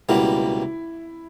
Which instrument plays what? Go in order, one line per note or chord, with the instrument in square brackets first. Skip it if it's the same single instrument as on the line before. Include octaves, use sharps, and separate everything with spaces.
[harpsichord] C#2 B2 G3 A#3 [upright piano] E4